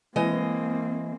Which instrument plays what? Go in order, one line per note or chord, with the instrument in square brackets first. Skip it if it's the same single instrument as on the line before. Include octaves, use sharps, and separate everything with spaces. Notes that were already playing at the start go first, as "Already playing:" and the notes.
[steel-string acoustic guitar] E3 G#3 D#5 [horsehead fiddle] A#3 C4